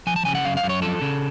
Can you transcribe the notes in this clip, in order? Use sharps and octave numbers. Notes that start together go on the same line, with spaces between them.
F3 G#5
A5
C#3 G#5
F#5
F#2 F5
F5
F#2
C#5
F3 A4
C#3